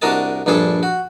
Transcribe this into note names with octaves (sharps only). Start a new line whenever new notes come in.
C2 D4 F#4 A#4 D#5 A5
A#1 G2 D4 G#4 A4
F#4